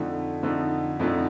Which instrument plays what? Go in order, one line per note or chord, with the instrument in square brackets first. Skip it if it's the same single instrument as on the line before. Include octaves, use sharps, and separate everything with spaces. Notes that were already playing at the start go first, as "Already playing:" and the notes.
Already playing: [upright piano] F2 D3 A3 D#4
F2 D3 A3 D#4
F2 D3 A3 D#4